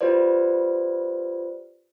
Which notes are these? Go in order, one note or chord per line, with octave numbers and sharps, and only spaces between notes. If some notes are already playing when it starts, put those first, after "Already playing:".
F4 G4 B4 C5 D5